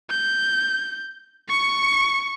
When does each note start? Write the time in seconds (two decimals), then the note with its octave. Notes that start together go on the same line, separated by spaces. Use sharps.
0.10 G6
1.49 C#6 C#7